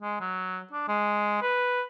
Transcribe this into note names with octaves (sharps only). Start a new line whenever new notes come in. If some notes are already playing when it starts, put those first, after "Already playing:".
G#3
F#3
D4
G#3
B4